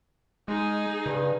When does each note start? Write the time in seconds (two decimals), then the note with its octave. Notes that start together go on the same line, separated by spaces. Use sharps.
0.48 G#3 D#4 G#4
1.06 G2 C#3